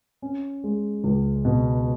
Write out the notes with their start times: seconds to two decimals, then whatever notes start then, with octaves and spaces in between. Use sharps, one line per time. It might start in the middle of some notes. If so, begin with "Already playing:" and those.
0.22 C#4
0.64 G#3
1.04 C#2
1.45 B2